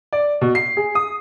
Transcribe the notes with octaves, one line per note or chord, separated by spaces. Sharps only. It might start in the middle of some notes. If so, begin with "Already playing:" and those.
D5
B2
C7
G#4
D#6